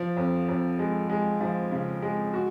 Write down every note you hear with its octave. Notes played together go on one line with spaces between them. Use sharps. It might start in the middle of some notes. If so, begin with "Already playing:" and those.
Already playing: F3
F2
F2
G#3
G#3
F3
C#3
G#3
F#4